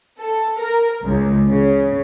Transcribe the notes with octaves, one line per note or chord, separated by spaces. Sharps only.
A4
A#4
C#2
C#3